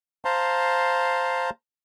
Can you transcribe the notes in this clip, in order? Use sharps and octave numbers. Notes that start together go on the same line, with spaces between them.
C5 F5 A5 A#5 C6